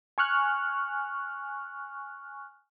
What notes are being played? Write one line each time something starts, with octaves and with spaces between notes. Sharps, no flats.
G#5 C#6 F6 F#6